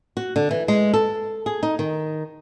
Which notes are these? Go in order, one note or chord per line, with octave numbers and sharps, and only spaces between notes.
F#4
D3
E3
G#3
A4
G#4
D#4
D#3